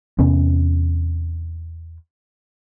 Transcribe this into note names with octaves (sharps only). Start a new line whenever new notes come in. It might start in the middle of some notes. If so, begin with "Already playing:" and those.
E2 C3 B3 C#4